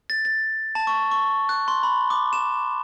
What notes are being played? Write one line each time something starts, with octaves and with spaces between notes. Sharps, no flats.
A6
A6
A5
C#6
C#6
F#6
C6
B5
D6
E7